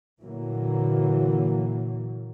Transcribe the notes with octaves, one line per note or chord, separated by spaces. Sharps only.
A#2 D3 E3 F#3 A#3